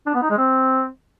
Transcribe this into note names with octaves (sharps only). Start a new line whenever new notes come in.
D4
B3
D#4
G#3
C4